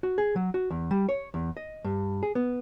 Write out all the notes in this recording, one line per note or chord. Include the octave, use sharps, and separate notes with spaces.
F#4
G#4
F#3
F#4
E2
G3
C#5
E2
D#5
G2
G#4
B3